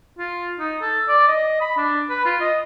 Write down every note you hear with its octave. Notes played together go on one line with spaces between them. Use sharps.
F4
D#4
A4
D5
D#5
B5
D4
B4
F4
D#5